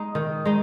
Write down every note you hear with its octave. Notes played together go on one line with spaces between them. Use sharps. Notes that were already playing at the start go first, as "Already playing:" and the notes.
Already playing: G#3 D#4
D#3
G#3 D#4